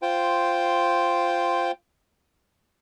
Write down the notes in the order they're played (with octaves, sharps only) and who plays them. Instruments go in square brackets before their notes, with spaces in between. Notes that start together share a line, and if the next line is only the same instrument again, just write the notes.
[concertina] F4 C5 G5